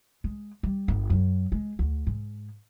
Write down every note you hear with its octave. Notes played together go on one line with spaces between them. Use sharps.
G#3
G3
G1
F#2
G#3
D2
G#2